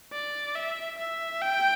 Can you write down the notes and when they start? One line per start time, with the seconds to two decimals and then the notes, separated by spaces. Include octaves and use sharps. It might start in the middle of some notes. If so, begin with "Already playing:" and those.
0.13 D5
0.56 E5
0.98 E5
1.42 G5